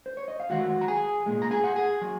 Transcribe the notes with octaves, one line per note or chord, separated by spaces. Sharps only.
C5
C#5
D#5
F5
F#2 D#3 G#3 F#4 F#5
A#5
G#4 G#5
C2 A#2 G#3
A#5
G#4 G#5
F#5
G#4 G#5
F#3